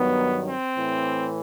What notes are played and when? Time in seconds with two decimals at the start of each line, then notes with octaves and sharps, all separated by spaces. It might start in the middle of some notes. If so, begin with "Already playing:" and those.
Already playing: G2 D#3 F#3 B3
0.48 C4
0.78 A2 E3